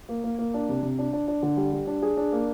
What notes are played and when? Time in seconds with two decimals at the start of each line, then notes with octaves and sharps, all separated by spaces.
0.09 A#3
0.24 A#3
0.38 A#3
0.54 D4
0.69 C3
0.83 C3
0.99 D4
1.13 D4
1.28 D4
1.43 D3
1.57 G3
1.73 G3
1.87 D4
2.02 G#4
2.17 D4
2.32 A#3